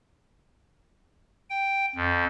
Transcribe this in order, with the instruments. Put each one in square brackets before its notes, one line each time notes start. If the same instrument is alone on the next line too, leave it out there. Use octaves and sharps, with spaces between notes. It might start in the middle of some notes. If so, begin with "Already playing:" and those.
[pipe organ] G5
F2